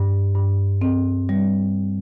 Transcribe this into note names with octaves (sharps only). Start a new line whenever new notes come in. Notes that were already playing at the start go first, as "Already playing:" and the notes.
Already playing: G2
G2
C4
G3